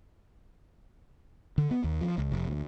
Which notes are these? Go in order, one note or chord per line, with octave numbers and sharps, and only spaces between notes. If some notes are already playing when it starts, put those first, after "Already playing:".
D3
B3
D#2
F3
C#2
F1
D2